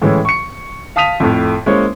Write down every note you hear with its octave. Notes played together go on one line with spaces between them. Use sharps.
A2 E3 G#3 C#4
C#6 C#7
F5 A5 D#6 B6 D#7 F7
F2 A2
G#3 A#3 C#4 E4 C5 C#5